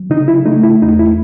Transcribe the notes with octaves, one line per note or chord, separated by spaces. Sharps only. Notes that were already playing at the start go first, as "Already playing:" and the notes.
Already playing: F#3
C#3 D#4
E4
A3 D#4
E4
E2 D#4
E4